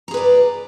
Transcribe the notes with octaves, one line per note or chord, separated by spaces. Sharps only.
G#4 B4 D5 A#5